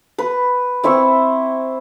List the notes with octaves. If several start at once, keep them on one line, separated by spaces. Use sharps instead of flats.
B4
C4 E4 E5 C#6